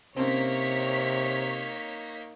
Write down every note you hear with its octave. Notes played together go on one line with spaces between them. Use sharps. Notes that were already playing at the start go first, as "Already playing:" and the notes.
C3 A#3 C4 C#4 D#4 C#5 B6